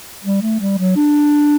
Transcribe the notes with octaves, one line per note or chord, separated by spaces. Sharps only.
G3
A3
G3
F#3
D4